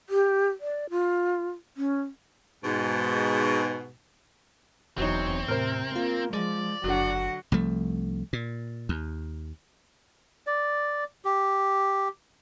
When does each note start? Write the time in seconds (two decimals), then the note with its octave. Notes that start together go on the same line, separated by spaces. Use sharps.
0.09 G4
0.60 D5
0.90 F4
1.77 C#4
2.64 G#2 B2
4.98 E1 E2 F#3 C4 D#4 C#5
5.48 A2 C3 A#4 C5
5.96 A#3 F4
6.34 F3 G#3 D5
6.84 F#1 D3 F#3 F#4 F#5
7.52 C2 F3 A3
8.33 A#2
8.89 D#2
10.47 D5
11.25 G4